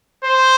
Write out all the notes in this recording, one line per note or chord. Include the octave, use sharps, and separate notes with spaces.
C5